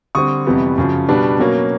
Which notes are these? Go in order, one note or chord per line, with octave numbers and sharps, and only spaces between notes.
D3 G3 C4 C#6 D#6
F2 C3 E3 G3 B3
F#2 C#3 F3
B2 G3 B3 D4
B2 F#3 A#3 C#4